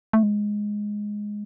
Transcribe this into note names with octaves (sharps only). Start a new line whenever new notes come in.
A3
G#3